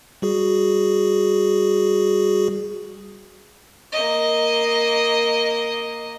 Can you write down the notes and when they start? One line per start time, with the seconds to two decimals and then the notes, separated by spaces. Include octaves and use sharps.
0.22 G3 F#4 G#4
3.92 A#3 D#5